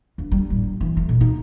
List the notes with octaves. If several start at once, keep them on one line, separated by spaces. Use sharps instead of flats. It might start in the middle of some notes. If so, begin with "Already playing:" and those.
D2
G3
A1
G2
E3
A3
B2
D#4